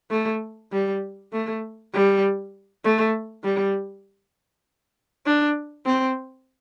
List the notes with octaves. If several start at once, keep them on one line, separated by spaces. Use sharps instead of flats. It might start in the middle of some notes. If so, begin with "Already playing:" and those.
A3
G3
A3
G3
A3
G3
D4
C4